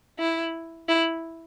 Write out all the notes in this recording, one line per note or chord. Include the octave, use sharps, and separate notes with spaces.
E4
E4